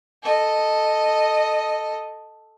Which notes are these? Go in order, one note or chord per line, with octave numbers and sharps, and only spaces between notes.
A4 D#5